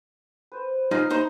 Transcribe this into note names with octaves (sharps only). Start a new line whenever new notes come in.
B4 C5
G#3 D#4 F4
D#4 E4 C5 C6